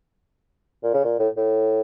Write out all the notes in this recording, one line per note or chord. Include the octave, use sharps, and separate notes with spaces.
A#2
C#3
A#2
A2
A2